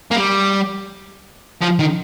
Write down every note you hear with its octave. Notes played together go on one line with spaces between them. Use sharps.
A#3
G3
F3
D#3